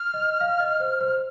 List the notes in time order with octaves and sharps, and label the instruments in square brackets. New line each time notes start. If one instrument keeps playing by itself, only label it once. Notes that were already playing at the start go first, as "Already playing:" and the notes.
Already playing: [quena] F6
[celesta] D#5
F5
D#5
C5
C5